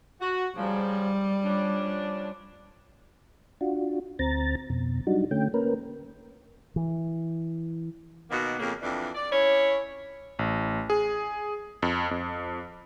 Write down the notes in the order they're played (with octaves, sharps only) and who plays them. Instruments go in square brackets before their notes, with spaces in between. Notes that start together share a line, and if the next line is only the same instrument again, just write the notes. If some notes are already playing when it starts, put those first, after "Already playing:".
[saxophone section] F#4
[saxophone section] G#2 C#3 F3 [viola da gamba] G3
[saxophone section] F3 C#4 D4
[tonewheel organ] D4 F4 F#4
D2 C4 A#5 A6
F2 B2
F#3 G3 D4 D#4 F#4
D3 A3 C#4 G5
A#3 C#4 A#4 B4
[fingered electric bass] E3
[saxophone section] B2 D#3 A#3 B3 F#4
F2 C#3 A#3
F2 E3 D4
D5
C#4 E4 C#5
[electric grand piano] A1
G#4
F2
F2